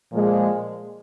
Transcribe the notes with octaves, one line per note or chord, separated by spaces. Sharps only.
A#2 F3 G#3